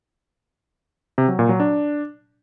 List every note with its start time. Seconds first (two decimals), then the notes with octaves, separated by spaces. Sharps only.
1.18 C3
1.28 F#3
1.39 A#2
1.49 F#3
1.60 D4